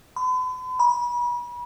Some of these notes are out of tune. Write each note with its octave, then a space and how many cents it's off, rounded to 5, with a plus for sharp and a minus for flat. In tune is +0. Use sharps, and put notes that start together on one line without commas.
B5 +45
B5 -35